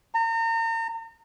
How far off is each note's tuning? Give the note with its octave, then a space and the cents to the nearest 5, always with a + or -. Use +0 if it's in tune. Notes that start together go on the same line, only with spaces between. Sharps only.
A#5 -40